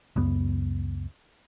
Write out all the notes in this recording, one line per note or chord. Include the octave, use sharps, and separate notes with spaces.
C#2 F#2 B3